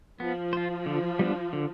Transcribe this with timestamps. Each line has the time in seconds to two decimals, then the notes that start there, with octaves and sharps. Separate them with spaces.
0.20 F3 B3
0.53 F4 C5
0.86 D3
1.19 G3 B3 D4
1.53 D3